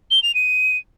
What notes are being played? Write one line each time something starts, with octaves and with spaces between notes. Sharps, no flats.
G7
F7
D#7